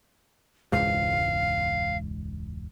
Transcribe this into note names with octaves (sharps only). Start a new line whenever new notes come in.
E1 C#2 G#2 F5